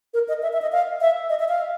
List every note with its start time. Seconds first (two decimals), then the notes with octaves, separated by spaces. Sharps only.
0.14 A#4
0.28 D#5
0.42 E5
0.53 E5
0.62 D#5
0.72 F5
1.01 E5
1.29 D#5
1.40 E5
1.48 F5